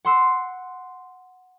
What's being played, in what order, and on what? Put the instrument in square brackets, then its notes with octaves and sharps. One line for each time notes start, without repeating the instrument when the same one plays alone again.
[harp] F#5 C6 E6